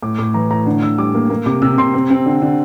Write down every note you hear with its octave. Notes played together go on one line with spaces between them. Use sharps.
A2 D6
A2 D6
E3 A#5
A2 A#5
D3
D3 E6
G3 D6
A#3
A#3
C3 D6
C3 E6
C3 C6
C4
C4
D3
D3